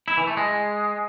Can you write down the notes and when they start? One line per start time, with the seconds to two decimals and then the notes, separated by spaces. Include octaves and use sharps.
0.08 E4
0.17 E3
0.27 A3
0.37 G#3